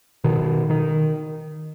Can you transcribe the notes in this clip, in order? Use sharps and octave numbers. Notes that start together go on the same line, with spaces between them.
B2 D#3
D#3